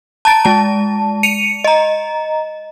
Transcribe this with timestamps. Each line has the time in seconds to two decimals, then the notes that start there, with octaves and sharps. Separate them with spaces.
0.25 A5 A#5 A6 D7
0.45 G#3 A5
1.23 C#7 D#7 F7
1.64 D#5 A#5